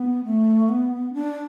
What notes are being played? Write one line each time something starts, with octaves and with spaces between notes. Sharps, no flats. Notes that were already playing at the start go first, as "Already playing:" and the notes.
Already playing: B3
A3
B3
D4